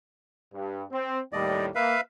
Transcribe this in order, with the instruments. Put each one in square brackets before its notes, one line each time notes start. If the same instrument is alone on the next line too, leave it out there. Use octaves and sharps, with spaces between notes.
[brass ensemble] G2
C4
[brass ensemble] D#2 A2 G3 [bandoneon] D5 D#5
[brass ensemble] A#3 [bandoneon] B4 E5 F5